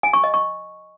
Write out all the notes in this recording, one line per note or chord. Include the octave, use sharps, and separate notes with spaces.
G#5
C#6
D#5
C#6